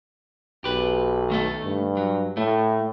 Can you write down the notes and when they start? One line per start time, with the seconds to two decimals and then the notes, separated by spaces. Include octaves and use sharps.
0.64 B1 G4 B4
1.30 D#3 A3 A4
1.64 G2
1.97 F#3
2.37 A2 A3